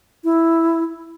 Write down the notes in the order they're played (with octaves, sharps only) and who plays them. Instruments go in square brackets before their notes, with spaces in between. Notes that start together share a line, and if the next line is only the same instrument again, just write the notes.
[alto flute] E4